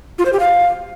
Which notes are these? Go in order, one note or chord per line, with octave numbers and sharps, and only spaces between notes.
F4
C5
G4
F5